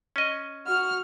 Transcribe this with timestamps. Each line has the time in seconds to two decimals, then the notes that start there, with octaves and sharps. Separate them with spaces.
0.16 C#4 D#5
0.67 F#4 F6